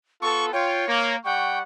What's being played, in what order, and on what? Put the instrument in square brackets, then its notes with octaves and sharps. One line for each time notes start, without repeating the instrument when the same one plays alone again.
[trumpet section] B3 F4 A4 [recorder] C#6
[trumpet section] F4 G5 [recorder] C#5
[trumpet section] A#3
[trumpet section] G3 F#5 C#6 [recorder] G5